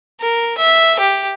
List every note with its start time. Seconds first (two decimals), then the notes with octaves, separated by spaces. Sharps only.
0.21 A#4
0.58 E5
0.99 G4